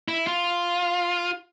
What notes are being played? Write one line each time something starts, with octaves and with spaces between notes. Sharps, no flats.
E4
F4